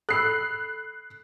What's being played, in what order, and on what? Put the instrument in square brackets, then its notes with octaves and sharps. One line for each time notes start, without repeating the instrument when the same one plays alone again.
[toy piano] A4 B5 E6 [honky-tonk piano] F#6 C7